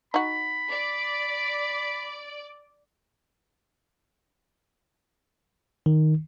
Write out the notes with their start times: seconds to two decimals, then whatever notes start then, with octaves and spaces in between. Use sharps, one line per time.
0.14 D#4 F#4 B5
0.69 D5
5.86 D#3